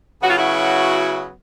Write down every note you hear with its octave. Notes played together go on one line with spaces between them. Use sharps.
C#3 F#3 B3 F#4
F4
E4 F#4